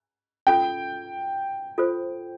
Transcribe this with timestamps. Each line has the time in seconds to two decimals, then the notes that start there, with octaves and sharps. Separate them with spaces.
0.47 C#4 F4 A4 G5
1.78 F4 A4 C5